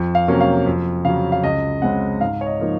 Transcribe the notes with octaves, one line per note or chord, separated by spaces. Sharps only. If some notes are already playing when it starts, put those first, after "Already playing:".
Already playing: F2
F5
C3 F#3 A#3 C#4
F5
F2
C#3 F#3 F5
F5
C#2 D#5
C#3 G#3 C4 F#5
G#2 F5
C#5
D#5
F3 A#3 D#4